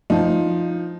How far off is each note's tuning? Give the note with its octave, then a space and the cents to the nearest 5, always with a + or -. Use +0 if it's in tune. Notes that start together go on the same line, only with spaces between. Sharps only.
F3 +0 D#4 +5